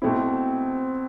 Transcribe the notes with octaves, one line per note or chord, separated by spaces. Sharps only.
B2 A3 C4 E4